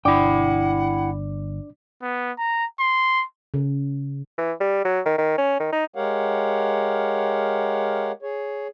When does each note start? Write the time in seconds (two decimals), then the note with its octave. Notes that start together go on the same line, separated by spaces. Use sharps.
0.05 G1 D4 E4 D5 F#5 G5 D6
2.02 B3
2.38 A#5
2.79 C6
3.54 C#3
4.38 E3
4.60 G3
4.85 F#3
5.06 D#3
5.18 D#3
5.38 C#4
5.60 D#3
5.72 D#4
5.95 G#3 G4 A#4 C#5 F5 F#5
8.22 G#4 C#5